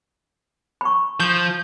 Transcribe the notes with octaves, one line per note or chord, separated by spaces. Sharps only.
B5 C#6
F3 G6